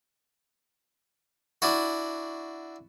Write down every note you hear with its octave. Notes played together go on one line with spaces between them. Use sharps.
D4 E4 F#4